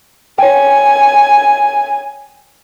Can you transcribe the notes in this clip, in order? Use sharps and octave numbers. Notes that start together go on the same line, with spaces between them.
C#5 G5 G#5